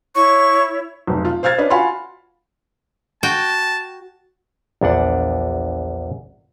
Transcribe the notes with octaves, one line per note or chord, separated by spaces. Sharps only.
E4 C#5 C#6
F1 B1
F4
C5 F5 F6 G#6 A6
C#4 D4 B4 D#5
F4 F#4 F5 G#5 B5 C6
F#4 G5 A5
A#1 E2 D4 F#5